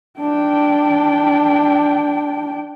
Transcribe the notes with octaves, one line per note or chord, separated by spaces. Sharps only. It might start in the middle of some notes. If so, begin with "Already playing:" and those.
D4 G5